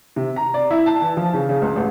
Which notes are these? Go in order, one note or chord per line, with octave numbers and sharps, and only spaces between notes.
C3
A#5
D5
E4
A5
E3
F3
C#3
C#3
C#2
A1